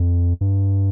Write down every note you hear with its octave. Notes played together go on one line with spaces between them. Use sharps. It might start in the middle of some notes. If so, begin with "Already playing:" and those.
Already playing: F2
G2